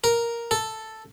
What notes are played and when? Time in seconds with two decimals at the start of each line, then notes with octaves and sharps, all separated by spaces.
0.04 A#4
0.51 A4